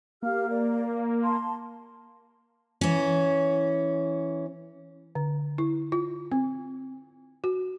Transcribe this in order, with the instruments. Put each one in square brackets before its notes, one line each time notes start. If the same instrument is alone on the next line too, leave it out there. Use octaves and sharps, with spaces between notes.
[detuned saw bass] A#3 [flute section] G4 F5 F6
[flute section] A#4 D5
A5 C6
[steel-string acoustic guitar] E3 C#4
[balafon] D3
E4
F4
C4
F#4